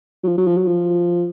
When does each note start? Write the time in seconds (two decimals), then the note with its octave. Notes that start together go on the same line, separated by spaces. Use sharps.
0.23 F#3
0.28 F3
0.37 F#3
0.47 F3
0.58 F#3
0.67 F3